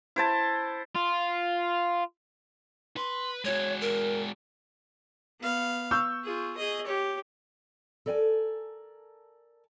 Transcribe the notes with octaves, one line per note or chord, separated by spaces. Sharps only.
E4 C5 A5
F4
B4 C6
G#3 F#4 C#5
A#4
B3 F5
C#6 E6 G6
F4 G#4
G#4 D#5
G4 C#5
A4 A#4 D5 F5 G#5 A5